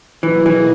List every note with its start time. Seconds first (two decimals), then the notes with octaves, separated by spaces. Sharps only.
0.23 B2 E3 F#3 A#3 D#4 G#4
0.46 E3